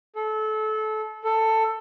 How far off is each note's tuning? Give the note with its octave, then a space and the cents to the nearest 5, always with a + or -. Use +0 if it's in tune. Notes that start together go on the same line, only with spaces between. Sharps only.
A4 -25
A4 +15